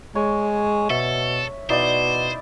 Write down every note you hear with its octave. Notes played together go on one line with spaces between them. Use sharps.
G#3 C#5
B2 A4 E5
B2 D#4 E4 C5 D5